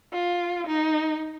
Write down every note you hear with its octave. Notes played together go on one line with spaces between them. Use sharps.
F4
D#4